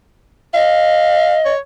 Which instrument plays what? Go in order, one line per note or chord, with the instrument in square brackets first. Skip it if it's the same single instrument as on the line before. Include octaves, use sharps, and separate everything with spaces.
[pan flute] D#5 [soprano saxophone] F5
[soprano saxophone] C#5